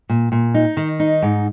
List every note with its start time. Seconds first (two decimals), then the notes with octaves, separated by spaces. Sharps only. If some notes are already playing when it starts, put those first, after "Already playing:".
0.09 A#2
0.32 A#2
0.54 D#4
0.77 D#3
1.00 D#4
1.22 G#2